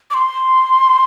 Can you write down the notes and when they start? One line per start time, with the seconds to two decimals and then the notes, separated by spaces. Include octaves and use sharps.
0.11 D6
0.14 C6